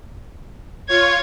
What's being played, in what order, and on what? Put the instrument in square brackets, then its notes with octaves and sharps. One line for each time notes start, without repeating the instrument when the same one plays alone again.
[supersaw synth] F4 C#5 [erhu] G#6